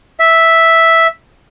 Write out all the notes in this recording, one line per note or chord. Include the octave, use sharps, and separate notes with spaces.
E5